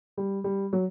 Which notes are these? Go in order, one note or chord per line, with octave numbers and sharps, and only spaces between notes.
G3
G3
F#3